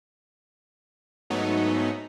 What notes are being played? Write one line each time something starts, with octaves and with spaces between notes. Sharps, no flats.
G#2 F#3 A3 B3 D#4